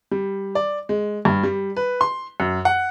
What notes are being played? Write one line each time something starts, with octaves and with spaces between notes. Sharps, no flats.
G3
D5
G#3
G2
G3
B4
C6
F#2
F#5